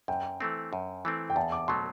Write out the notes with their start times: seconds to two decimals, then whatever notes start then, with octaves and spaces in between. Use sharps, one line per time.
0.08 F#2 G5
0.40 E3 A3 C4
0.73 F#2
1.05 E3 A3 C4
1.30 G5
1.36 E2 A5
1.52 D6
1.68 B2 F#3 A3 C6